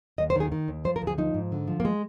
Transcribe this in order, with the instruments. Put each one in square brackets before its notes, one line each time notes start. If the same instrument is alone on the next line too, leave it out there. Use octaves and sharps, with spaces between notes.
[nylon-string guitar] D#2 D#5
C5
D#3 G#4
D#3
D#2
F3 C5
A#4
D2
G#4
F3 D#4
G#2
D3
F3
A#3
G#3